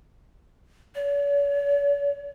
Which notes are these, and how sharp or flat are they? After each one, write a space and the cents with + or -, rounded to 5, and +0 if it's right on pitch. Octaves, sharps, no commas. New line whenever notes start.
C#5 +45